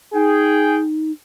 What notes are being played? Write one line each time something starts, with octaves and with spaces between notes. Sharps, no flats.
D#4 G#4 G5